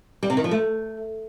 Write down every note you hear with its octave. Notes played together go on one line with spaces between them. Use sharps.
G3
C3
D#3
F3
A3